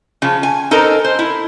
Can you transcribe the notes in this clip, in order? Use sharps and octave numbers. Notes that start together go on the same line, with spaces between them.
C#3 F3
G#5
D#4 A4 A#4 C5 D#5
C5
E4